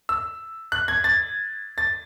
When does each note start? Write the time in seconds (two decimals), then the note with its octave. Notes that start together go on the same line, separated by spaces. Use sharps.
0.09 E6
0.72 F#6
0.88 G#6
1.04 A6
1.78 A6